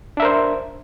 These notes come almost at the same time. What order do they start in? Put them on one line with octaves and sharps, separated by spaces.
D4 E5 A#4 C5